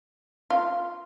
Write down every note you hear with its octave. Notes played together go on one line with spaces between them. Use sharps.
F4